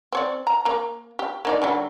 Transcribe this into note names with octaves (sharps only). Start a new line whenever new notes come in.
C4 C#5 D5
A#5
A#3 A#5
G4
A#3 D#4 D5
D3 F#3 G3